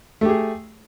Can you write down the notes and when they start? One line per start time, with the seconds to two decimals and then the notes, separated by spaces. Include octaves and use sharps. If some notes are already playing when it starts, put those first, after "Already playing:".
0.21 A3
0.25 G4
0.29 G#4